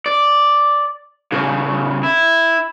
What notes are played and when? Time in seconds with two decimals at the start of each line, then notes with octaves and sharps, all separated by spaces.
0.06 D5
1.32 A2 C#3
2.03 E4